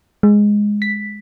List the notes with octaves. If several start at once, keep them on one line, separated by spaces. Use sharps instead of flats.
G#3
B6